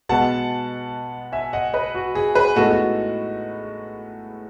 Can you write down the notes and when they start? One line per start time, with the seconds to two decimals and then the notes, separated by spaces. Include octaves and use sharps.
0.09 B2 G#3 B3 F#5 A5
1.32 E5 G#5
1.53 D#5 F#5
1.73 B4 D#5
1.95 F#4
2.15 G#4
2.35 G#4 B4
2.56 A2 G#3 B3 D#4 F#4 A4
2.72 F#4